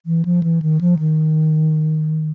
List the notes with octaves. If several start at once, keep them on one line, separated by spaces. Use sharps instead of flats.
E3
F3
E3
D#3
F3
D#3